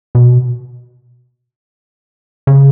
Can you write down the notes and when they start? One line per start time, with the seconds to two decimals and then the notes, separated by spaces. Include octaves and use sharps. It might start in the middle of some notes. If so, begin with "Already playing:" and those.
0.15 B2
2.47 C#3